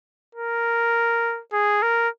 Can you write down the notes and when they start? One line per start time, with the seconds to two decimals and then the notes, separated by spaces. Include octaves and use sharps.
0.35 A#4
1.53 G#4
1.82 A#4